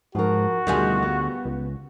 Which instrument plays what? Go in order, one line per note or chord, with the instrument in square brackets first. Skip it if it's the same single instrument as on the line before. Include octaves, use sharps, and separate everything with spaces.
[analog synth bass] G#2 [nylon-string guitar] F3 A#4 [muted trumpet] F#4
[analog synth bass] D2 [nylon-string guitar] B2 D#3 [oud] G3 F4 G#4
[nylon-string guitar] B3
[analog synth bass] C#2